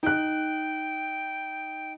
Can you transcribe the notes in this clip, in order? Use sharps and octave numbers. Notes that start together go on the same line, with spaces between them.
D#4 G5 F#6